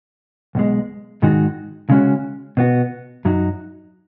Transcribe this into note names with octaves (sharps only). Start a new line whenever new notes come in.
B1 B2 G#3
G#2 D#3 G#3 D#4 F#4
C#3 G#3 C#4 F#4
B2 B3 F#4
F#2 F#3 D#4 F#4